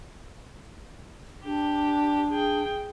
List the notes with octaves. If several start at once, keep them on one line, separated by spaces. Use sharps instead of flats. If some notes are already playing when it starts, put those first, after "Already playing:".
D4 G4
G#4 G5